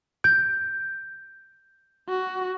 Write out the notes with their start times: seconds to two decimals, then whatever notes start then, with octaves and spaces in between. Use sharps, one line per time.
0.24 G6
2.09 F#4